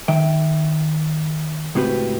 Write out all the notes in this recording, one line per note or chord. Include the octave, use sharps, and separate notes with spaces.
D#3 E5 G5
C#2 A2 C4 F#4 G4 B4